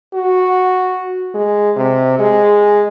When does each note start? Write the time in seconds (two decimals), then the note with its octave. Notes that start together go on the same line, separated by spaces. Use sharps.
0.14 F#4
1.34 G#3
1.76 C3
2.19 G#3